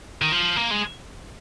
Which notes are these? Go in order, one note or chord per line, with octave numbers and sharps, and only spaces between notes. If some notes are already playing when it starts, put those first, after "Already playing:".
D#3
F3
A#3
G#3